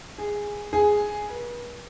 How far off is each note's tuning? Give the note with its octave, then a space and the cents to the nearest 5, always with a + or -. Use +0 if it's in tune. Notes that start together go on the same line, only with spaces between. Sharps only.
G#4 -10
G#4 +0
B4 -40